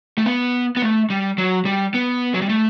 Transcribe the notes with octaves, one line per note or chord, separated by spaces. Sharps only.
A3
B3
B3
A3
G3
F#3
G3
B3
F#3
G3
A3